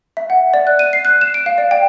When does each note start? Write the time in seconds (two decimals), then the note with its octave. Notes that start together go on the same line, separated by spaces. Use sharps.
0.17 E5
0.30 F#5
0.54 D5
0.67 F#6
0.79 D#7
0.93 C7
1.05 F#6
1.21 E7
1.34 D7
1.46 F5
1.58 D5
1.71 G5